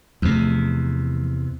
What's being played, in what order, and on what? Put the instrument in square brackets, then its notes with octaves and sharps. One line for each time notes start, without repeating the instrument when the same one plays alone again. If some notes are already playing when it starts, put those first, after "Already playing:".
[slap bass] E2 C3 [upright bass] F3 A3